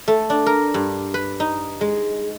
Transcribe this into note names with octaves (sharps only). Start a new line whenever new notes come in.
A3
D4
A#4
G2
B4
D#4
G#3